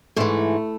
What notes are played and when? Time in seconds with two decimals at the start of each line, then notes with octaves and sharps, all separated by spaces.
0.16 G#2 E3 A3